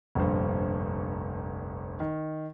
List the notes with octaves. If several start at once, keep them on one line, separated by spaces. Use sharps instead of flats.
F1 A#1 G2 C5
D#3